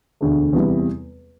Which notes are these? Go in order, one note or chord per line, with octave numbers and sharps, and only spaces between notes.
E1 D2 D3 A3
E2 C3 G3 B3 E4